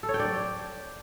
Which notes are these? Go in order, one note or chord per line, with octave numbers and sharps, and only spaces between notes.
A4
C#5
G5
D5